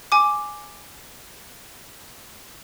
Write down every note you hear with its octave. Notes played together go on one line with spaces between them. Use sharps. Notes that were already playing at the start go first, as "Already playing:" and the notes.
G#5 D6